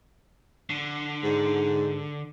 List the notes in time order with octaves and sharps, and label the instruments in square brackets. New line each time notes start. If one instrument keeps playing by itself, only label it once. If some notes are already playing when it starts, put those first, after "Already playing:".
[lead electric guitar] D3
[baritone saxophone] G#2